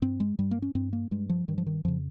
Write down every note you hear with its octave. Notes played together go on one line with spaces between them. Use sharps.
G2 C4
G#3
G2 G3
A#3
C#4
G2 C4
A#3
G2 G#3
F3
G2 D#3
F3
D#3
F2 C#3 F3